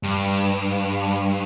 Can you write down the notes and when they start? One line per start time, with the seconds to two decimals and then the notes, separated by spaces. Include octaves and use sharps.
0.03 G2